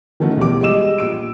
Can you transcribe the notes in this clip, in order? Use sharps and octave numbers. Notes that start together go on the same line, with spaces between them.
D#3 E3 A3 C#4 F#4
B1 E3 G3 D6
G3 G#3 D#5 E6 E7
A#1 E6 D7